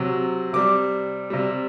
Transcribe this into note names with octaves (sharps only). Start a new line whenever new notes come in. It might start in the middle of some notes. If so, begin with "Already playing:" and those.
Already playing: C3 F#3
C3 G3 D6
C3 G3